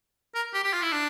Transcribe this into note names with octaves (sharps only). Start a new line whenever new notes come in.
A#4
G4
G4
F4
E4
D4